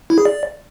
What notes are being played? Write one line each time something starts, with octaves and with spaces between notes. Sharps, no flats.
E4
G#4
D5